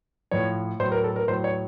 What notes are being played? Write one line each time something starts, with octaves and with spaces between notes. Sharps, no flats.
A2 F3 C#5
A2 F#3 C5
A#4
A4
A#4
A2 F#3 C5
C#5